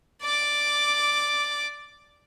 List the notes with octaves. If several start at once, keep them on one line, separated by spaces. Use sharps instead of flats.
D5 D6